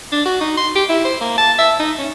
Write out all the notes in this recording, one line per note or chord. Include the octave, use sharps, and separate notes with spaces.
D4
F#4
D#4
C6
G4
E4
C5
A#3
A5
E5
D#4
C#4